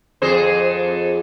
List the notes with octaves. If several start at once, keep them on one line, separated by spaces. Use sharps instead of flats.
F2 G#4 C5